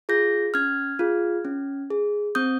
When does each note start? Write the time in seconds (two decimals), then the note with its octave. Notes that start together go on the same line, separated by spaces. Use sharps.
0.09 F4 G#4 G6 A#6
0.54 C#4 F6 G#6
0.99 F4 G#4
1.45 C#4
1.90 G#4
2.35 C4 D#6 G6